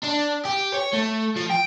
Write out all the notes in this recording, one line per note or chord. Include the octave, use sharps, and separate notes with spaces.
D4
G4
C#5
A3
F3
G5